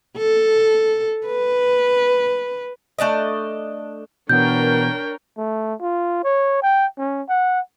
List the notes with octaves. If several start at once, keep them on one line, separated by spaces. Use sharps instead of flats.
A4
B4
A3 D4 D5 D#5
B2 E3 B3 D4 A#4 C#5 G5 G6
A3
F4
C#5
G5
C#4
F#5